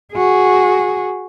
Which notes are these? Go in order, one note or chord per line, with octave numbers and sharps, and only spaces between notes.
F#4 G#4